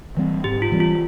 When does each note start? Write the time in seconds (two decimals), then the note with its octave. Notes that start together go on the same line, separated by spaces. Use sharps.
0.17 E3 G3 C4
0.44 G#2 G4
0.62 F4
0.72 E3 G3 C4
0.80 F4